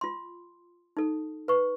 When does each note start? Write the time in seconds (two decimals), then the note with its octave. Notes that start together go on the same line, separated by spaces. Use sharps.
0.01 F4 C6
0.97 D#4 A4
1.48 B4 C#6